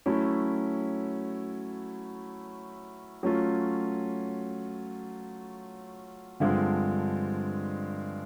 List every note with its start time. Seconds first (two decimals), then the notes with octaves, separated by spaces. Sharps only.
0.06 F#3 A3 C#4 E4
3.23 F#3 A3 C#4 F4
6.40 G2 D3 F3 G#3 C4